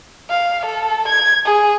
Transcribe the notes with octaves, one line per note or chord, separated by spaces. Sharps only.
F5
A4
G#6
G#4